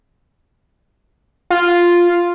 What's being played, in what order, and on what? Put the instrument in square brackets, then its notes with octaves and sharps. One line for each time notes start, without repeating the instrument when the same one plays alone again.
[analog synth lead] F4